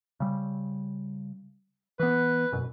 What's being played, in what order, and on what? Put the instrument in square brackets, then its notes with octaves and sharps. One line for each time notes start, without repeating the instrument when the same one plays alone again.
[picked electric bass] C#3 G3
[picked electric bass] E3 B3 [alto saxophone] B4
[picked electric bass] E1 F#2 B2